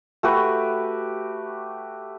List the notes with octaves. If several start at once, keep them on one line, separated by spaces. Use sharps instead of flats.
A3 F#4 G4 B4